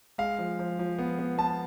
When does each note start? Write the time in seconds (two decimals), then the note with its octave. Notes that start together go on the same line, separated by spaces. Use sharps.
0.18 G#3 F5
0.38 F3
0.59 F3
0.79 F3
0.99 B3
1.19 B3
1.38 B3 A5